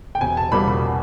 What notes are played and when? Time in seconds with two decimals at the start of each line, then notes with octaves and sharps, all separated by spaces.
0.15 G5
0.21 E1 G#5
0.37 A5
0.52 E2 B2 G3 A#3 B5
0.68 B5